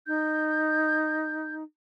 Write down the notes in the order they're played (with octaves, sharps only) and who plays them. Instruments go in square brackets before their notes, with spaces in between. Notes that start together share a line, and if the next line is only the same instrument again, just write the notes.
[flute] D#4 [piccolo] G6